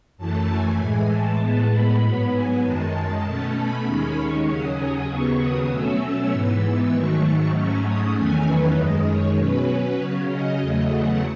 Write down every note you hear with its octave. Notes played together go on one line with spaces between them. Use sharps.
F#2 E3 A3 A5
G#5
A2 E3 G#3
A5
A2 G#3 B3 A5
B5
G#2 F#3 B3 B5
G#5
F#2 D#3 G#3 A5
B2 A3 C#4
B5
D#2 D#3 G#3 C#4
C#6
D#2 C#3 F#3 C#4 D#6
D#2 C#3 F#3 B3 C#6
D#6
B2 F#3 A3 C#4 E6
G#2 E3 B3
E6
G#2 D#3 F#3 A3 C#6
G#2 F#3 A3 C#4 C#6
D#6
E2 D#3 F#3 A3 C#4 G#5
B4
F#2 D#3 G#3 D#5
C#5
B2 F#3 C#4 B4
C#3 F#3 C#4 C#5
D#5
E2 C#3 F#3 A3
F#5